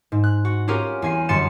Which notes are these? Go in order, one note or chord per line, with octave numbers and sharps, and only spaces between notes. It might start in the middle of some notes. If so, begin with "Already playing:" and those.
G#2
F#6
F#4
C#4 F4 G4 G#4 A#4
E2 G#5 C7
G1 F#2 C6 A6 C#7 E7